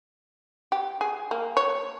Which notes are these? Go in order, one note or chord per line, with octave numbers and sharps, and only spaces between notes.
G4
G#4
A#3
C#5